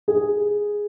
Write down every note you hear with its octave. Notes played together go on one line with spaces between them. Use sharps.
G#4